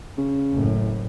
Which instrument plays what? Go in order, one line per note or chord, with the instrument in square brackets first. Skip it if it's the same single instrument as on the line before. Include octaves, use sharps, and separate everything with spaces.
[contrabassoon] C#3
[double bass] F#1 A2